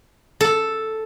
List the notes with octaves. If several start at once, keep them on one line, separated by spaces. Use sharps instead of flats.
A4